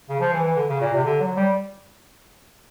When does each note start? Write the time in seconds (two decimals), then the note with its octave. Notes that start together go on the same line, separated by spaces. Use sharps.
0.09 C#3
0.20 F3
0.33 E3
0.44 E3
0.56 D3
0.69 C#3
0.81 A#2
0.93 C3
1.04 D3
1.20 F#3
1.36 G3